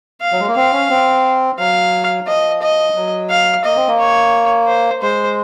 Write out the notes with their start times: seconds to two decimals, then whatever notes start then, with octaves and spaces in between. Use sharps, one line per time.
0.21 F5
0.32 F#3
0.40 G#3
0.48 A#3
0.55 C4 F5
0.73 C#4
0.90 C4
1.58 F#3 F5
2.27 F3 D#5
2.62 D#5
2.95 F#3
3.30 F5
3.65 A#3 D#5
3.76 C4
3.87 A#3
3.99 C#5
4.68 C5
5.02 G#3 C5